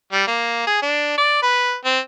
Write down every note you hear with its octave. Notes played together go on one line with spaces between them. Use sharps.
G3
A#3
G#4
D4
D5
B4
C4